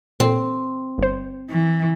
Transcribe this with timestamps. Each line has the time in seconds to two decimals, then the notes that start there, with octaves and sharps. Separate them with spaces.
0.20 A#2 C4
0.98 G1 C5
1.50 E3